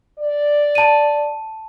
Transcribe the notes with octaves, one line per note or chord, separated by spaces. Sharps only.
D5
A5 D#7